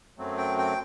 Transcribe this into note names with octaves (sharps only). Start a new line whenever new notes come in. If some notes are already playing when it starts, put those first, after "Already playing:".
F#2 F#3 A3 C4
G5
G5